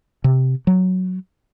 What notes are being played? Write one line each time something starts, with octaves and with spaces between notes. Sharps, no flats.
C3
F#3